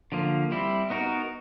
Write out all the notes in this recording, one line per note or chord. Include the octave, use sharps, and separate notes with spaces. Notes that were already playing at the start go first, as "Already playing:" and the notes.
D3 F3 A#3
G3 C4 E4
B3 D#4 F#4 A#4